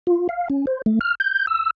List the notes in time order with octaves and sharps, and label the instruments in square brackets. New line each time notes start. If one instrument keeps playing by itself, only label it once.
[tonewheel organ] F4
F5
C#4
C5
A3
F6
G6
E6